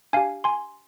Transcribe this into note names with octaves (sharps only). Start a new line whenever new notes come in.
D4 G4 F5 G#5
G#5 C6